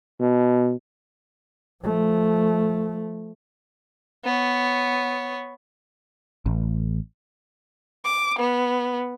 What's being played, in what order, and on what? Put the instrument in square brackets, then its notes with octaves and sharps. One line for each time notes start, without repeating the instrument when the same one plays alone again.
[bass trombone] B2
[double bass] F3 A3
[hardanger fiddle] B3 C#5
[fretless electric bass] A1
[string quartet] D6
B3